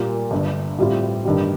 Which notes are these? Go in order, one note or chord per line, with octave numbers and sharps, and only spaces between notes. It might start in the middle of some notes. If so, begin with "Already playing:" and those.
Already playing: A#2 G3 A#3 F4
G1 G2 D3
A2 G3 C4 F4
G1 G2 D#3 G3